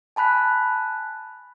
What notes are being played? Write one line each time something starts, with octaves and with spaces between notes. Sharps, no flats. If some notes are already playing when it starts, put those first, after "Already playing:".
G#5 A5 B5 F#6 B6